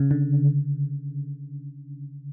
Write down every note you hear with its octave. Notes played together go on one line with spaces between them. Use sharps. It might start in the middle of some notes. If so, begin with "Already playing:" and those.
Already playing: C#3
D3